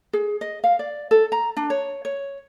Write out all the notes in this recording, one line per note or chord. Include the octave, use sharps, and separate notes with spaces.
G#4
D#5
F5
D5
A4
A#5
D4
C#5
C#5